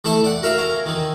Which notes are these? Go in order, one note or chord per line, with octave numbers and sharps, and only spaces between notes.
E3 A3 E4 E5 C#6
D5 F#5
F#4 A#4 E5 F5
C#4 A#4
D#3 E3